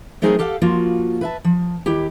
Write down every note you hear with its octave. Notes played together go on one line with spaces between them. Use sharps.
F#3 A3 C4 D#4 G#4 A#4
G4 A4 F5 F#5
F3 A#3 F4 F#4
B4 E5 A5
F3
D#2 E4 G4